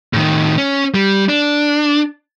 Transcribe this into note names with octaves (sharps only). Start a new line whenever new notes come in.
A2 D#3
C#4
G3
D4